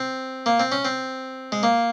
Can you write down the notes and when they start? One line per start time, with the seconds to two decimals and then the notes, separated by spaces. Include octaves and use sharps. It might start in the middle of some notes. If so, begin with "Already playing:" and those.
Already playing: C4
0.46 A#3
0.60 C4
0.72 C#4
0.85 C4
1.52 G#3
1.63 A#3